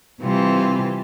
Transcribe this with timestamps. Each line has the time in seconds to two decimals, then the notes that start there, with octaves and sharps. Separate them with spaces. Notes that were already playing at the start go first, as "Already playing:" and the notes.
0.20 C3 E3 G3 C4 F4